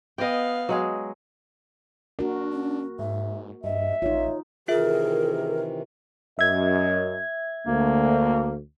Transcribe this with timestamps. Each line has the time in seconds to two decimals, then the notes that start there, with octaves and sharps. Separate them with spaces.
0.18 B3 D#5 F5 G5
0.69 F#3 G#3 G#4
2.19 A#3 D4 F#4 A#4
2.52 C#4
2.99 G#2 E5
3.64 G2 D#5 E5
4.02 A1 D#4 F4 C#5
4.68 C3 D#3 E3 F4 G#4 A#4 E5
6.39 F#2 D#5 E5 G#6
7.67 D2 A#3